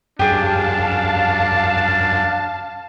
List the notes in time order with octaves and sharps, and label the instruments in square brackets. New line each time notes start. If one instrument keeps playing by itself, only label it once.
[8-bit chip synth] F#2 [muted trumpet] D4 [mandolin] G4 G#4 [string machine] F5 A5